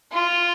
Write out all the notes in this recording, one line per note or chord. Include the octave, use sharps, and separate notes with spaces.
F4